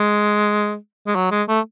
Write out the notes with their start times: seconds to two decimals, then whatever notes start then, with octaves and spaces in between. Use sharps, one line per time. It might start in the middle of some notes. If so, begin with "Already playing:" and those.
Already playing: G#3
1.07 G#3
1.15 F#3
1.31 G#3
1.49 A3